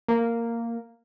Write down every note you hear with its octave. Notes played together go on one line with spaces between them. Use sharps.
A#3